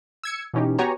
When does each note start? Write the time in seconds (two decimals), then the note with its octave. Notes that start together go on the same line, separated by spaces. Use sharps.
0.23 E6 G#6 C#7
0.54 B2 E3 C#4 D#4 G4
0.78 B3 F#4 G4 C#5 G#5 A#5